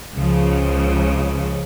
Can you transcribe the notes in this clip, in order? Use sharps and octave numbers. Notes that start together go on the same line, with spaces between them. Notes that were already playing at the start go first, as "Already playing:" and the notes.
C#2 C#3 F3